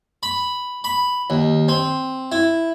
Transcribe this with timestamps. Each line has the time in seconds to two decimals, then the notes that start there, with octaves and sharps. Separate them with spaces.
0.23 B5
0.84 B5
1.30 D#2
1.68 C4
2.32 E4